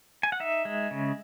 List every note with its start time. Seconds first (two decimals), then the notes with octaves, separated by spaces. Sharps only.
0.23 G#5
0.32 F#5
0.40 D#4 E5
0.65 G#3
0.91 C#3